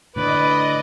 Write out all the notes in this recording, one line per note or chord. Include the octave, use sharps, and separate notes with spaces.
A2 D3 B4 D5 D#5